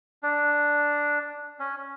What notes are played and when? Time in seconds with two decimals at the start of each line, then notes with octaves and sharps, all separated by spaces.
0.23 D4
1.60 C#4